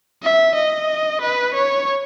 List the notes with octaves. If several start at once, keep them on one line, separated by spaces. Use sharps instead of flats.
E5
D#5
B4
C#5